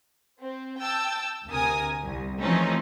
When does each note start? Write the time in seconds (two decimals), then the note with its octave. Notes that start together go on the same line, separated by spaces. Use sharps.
0.39 C4
0.79 G5 A5 E6
1.49 D2 C3 A#4 G#5 D#6
2.02 C2
2.41 E3 F3 A3 C4 C#4 D#4